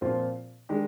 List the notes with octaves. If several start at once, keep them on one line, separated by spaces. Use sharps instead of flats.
A#2 F3 C4 F4 C5
D#3 G#3 D4 G4